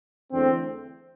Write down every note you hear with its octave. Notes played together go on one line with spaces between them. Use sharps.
E2 D3 A3 C4